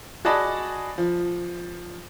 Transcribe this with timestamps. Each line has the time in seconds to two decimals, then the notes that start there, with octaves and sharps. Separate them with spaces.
0.25 F#4 G#4 D5 D#5 A5 B5
0.98 F3